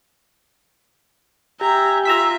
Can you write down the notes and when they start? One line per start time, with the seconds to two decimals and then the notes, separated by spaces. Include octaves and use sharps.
1.61 G4 E5 G5 G#5 A#5
2.05 F4 E5 A#5 E6 B6